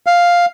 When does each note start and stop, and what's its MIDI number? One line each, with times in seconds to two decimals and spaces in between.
0.06 0.46 77